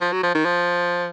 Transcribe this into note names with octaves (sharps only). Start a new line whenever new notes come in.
F3
F#3
F3
D#3
F3